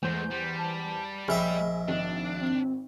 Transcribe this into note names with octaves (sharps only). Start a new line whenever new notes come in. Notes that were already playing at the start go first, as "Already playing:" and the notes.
E2 G#3 A3 C5 G6
G3
A5
A#1 G#4 D#5 E5 G5 B5 F6
G#1 D4
C4